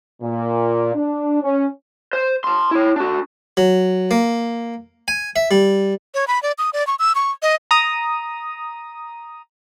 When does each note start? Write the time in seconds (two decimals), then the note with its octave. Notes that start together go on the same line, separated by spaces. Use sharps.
0.22 A#2
0.95 D4
1.42 C#4
2.13 C5
2.44 A5 C6
2.71 E4 C#5
2.96 D4 F#4
3.57 F#3
4.11 A#3
5.08 G#5
5.36 E5
5.51 G3
6.14 C#5
6.28 B5
6.43 D5
6.58 D#6
6.73 D5
6.87 C#6
6.99 E6
7.15 C#6
7.42 D#5
7.71 A#5 D#6